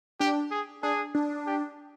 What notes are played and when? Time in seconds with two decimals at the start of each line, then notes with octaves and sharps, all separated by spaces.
0.20 D4 G4
0.51 G#4
0.83 D4 G#4
1.15 D4
1.46 G4